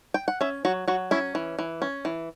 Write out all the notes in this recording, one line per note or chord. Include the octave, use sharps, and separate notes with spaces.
G5
F#5
C#4 E5
F#3 F#4
F#3 F#4
C#4 E4
E3
E3
C#4
E3